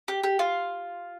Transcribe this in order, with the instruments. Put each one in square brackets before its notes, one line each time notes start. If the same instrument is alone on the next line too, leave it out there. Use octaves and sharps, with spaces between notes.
[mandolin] G4
G4
F4